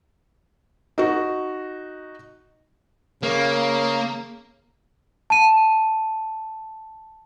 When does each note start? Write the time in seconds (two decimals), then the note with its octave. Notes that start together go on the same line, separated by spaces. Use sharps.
0.98 D#4 F#4
3.23 C#3 A#3
5.30 A5 D#7